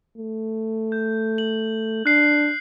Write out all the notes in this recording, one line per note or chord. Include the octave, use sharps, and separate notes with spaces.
A3
G6
F#7
D4 F#6 C7